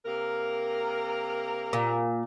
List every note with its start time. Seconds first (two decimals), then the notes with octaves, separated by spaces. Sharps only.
0.05 C3 A#3 A#4
1.73 A#2